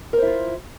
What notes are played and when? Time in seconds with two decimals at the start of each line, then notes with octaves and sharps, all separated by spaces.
0.13 A#4
0.18 C5
0.22 E4
0.27 F4